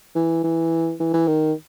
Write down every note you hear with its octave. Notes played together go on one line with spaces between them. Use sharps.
E3
E3
E3
E3
D#3